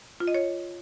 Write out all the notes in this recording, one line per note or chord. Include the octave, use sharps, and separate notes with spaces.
F4
D#5
C#5